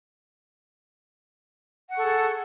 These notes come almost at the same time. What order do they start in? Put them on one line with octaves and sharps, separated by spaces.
F#5 C#6 A4 G#4